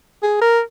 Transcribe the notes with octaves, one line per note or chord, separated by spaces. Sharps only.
G#4
A#4